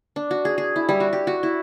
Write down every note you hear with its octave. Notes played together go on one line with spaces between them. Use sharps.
D4
F#4
G#4
G#4
E4
G3
F#4
G4
F#4
E4